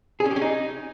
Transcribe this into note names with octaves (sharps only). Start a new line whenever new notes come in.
G#4
C#4
G4
C#4
D#4